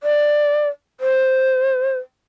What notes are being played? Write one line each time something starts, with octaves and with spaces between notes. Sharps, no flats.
D5
C5